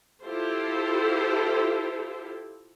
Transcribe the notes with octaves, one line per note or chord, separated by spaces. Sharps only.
E4 F4 G4 A4 C5